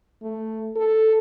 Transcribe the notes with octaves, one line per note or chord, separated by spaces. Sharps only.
A3
A4